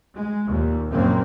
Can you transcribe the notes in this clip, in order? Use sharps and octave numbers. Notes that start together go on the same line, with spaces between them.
G#3
D#2 A#2
A#1 F#2 A#2 C#3 A#3 C4